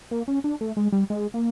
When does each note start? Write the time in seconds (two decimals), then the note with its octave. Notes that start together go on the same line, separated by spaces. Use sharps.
0.11 A#3
0.28 C#4
0.44 D4
0.61 A3
0.77 G#3
0.92 G3
1.10 G#3
1.34 A#3